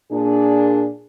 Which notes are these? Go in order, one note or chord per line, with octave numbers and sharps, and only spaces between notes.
A#2 D4 G#4